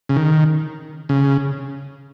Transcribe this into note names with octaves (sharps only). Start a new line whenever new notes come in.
C#3
D#3
C#3